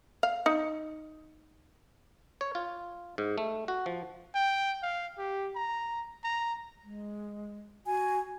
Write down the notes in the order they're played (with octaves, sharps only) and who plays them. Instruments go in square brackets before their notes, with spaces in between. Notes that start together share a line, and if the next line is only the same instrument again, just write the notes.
[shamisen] F5
D#4
[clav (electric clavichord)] C#5
F4
G#2
A3
F#4
F3
[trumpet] G5
F5
G4
A#5
A#5
[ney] G#3
[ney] F#4 [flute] G#5